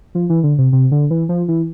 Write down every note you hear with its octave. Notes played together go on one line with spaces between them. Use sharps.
F3
E3
D3
C3
C3
D3
E3
F3
E3